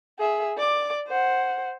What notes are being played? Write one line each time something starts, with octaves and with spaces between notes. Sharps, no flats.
G#4 E5
D5 D6
C5 F#5